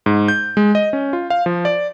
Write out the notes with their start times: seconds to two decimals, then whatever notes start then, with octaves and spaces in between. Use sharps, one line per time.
0.06 G#2
0.28 G6
0.57 G#3
0.75 D#5
0.93 C#4
1.13 F4
1.30 F5
1.46 F3
1.65 D5